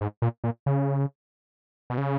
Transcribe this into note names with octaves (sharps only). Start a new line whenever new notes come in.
G#2
A#2
A#2
C#3
B2
C#3